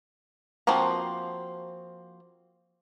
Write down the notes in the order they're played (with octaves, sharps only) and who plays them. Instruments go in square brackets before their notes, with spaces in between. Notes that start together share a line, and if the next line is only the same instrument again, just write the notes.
[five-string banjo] F3 A#3 C4 F#4 A#5